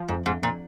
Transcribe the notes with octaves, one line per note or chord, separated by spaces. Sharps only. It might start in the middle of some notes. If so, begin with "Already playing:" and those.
Already playing: F3
F2 G#2
F2 G#2
F2 A#2